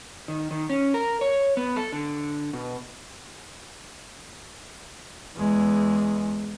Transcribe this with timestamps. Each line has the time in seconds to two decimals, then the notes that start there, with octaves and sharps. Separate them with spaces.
0.28 D#3
0.51 D#3
0.70 C#4
0.94 A#4
1.21 C#5
1.57 B3
1.76 A4
1.92 D3
2.53 B2
5.36 E2 G#3